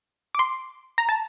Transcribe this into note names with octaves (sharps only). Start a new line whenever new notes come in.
D6
C6
A#5
A5